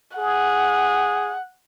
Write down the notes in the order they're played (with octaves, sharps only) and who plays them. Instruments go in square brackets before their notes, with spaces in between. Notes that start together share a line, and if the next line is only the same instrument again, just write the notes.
[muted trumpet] G#4 [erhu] F#5